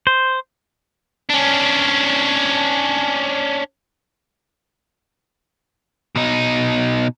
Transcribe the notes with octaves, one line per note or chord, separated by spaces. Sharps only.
C5
C#4 D4
B2 D#4